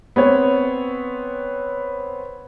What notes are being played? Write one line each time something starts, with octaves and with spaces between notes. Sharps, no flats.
B3 C4 C#5